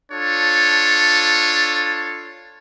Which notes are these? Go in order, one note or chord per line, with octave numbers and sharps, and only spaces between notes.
D4 F4 A4 C#5